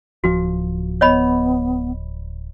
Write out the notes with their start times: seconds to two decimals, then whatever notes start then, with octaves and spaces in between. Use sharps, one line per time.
0.24 D1 F3 F#4
1.01 B3 C#5 D#5 B5